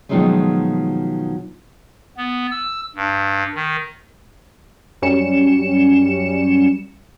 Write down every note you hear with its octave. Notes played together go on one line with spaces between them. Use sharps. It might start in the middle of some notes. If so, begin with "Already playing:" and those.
B2 D#3 F3 F#3 G#3 A3
B3
E6
G2
D#3
F#2 G3 C#4 C#7 E7